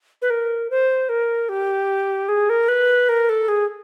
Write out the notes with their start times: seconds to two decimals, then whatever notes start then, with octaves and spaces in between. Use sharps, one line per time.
0.22 B4
0.30 A#4
0.70 C5
1.09 A#4
1.49 G4
2.29 G#4
2.50 A#4
2.68 B4
3.09 A#4
3.29 A4
3.48 G#4